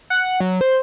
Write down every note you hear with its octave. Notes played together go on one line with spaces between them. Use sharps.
F#5
F#3
C5